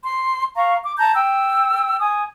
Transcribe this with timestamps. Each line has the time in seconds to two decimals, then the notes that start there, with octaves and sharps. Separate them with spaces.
0.05 C6
0.56 F5 A#5 C#6
0.83 D6
0.98 A5 A#5 G6
1.15 G5 E6
2.00 G#5 D#6